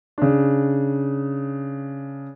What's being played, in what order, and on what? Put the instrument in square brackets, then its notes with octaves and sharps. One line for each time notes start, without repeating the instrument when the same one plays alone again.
[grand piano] C#3 D4